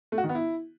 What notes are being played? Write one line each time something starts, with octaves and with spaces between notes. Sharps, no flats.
A3
F#4
D#3
B3
E4